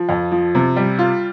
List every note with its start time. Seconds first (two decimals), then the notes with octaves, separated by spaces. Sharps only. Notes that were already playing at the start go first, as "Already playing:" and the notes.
Already playing: F3
0.09 F2
0.32 F3
0.55 C3
0.76 G3
0.99 F4